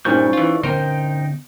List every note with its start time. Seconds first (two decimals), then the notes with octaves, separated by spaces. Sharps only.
0.05 G2 A#2 C#4 D#4 C5 D5 C#6 G6
0.33 E3 F4
0.63 D3 B3 C#4 D#4 A#4 C5 G5 D7